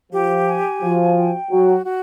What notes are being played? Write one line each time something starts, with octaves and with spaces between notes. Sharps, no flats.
F3 G4
G#5
F3 F#4
G5
F#3 F#4
F#4